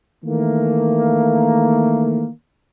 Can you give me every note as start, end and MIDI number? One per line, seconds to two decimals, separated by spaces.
0.25 2.28 51
0.25 2.28 52
0.25 2.28 57
0.25 2.28 58